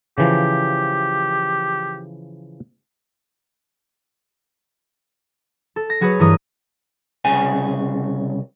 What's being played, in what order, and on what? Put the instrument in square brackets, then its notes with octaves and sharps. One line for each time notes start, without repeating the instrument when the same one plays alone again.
[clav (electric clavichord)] C#3 E3 F3 [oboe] G4
[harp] A4
A#6
F#3 F#4 G#4 B4 C#5
G2 E3 A#4 D#6
[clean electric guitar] C2 C#3 G#5